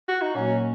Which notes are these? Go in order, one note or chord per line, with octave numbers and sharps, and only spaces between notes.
F#4
D#4
A#2 F#3 A#3 C#4